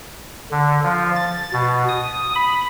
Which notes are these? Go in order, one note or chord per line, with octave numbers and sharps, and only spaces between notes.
D3
F3
A6
B2
D#6
B5